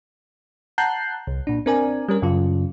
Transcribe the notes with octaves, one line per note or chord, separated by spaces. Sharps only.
F#5 A5 A#5 F#6 G6 C7
C2
A#2 D4
C4 D4 A#4 D5 G#5
G3 C#4 A#4
F#2 C#3 F4